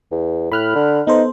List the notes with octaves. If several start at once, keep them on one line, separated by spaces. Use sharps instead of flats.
E2
A2 B5 F6 F#6
D3
B3 D#4 A4 C5